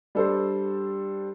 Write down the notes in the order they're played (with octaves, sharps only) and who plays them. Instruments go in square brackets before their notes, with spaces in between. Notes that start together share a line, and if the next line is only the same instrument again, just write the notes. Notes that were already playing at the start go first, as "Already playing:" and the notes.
[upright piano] G3 D4 A4 C5